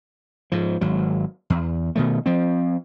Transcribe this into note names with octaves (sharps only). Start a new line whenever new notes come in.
G#2 F3
G#1 F#3
E2
B2 D#3 A3
F3 C4